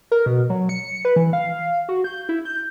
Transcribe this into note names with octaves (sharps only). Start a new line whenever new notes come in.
A#4
B2
F#3
C#7
B4
E3
F5
F#4
G6
E4
G6